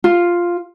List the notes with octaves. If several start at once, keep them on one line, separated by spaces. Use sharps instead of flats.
F4